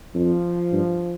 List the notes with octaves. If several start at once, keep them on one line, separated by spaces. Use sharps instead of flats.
F2 F3
G2